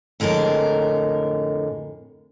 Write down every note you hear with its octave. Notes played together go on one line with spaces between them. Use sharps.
F2 A2 D3 G#3 A#4